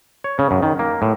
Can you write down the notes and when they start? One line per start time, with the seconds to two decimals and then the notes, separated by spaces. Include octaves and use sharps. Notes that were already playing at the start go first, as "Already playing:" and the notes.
0.24 C#5
0.39 C#3
0.51 F#2
0.63 D#3
0.79 A#3
1.02 A2